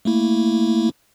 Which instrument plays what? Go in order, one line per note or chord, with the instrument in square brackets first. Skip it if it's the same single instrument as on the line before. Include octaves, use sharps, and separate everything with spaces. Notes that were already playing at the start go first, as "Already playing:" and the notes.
[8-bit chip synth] A3 A#3 E4